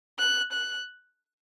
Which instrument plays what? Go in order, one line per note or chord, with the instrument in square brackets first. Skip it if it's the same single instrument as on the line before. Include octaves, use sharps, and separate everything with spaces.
[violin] F#6
F#6